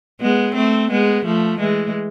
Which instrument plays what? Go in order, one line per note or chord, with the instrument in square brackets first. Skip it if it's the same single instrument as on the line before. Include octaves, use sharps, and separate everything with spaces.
[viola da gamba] G#3 B3
A3 C4
G#3 B3
F3 A3
E3 G#3